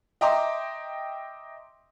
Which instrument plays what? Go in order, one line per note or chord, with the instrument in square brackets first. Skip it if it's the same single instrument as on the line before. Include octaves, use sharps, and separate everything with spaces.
[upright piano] D#5 E5 G5 A#5 C6 D6